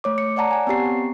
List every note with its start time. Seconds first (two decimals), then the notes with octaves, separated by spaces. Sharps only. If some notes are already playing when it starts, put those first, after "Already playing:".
0.04 A3 C#5 D6
0.18 C#7
0.36 C#5 D5 F#5 A5 A#5
0.51 F#5 G#5
0.67 B3 C4 G4 C7